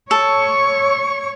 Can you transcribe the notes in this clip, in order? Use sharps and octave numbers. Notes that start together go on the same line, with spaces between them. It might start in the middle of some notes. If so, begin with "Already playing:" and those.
A4 C#5 C#6